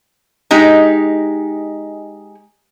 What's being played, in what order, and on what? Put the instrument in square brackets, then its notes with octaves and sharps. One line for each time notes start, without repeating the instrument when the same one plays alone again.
[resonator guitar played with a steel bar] G#3 D#4 G4